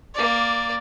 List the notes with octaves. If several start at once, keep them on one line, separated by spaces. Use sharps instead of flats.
A#3 D5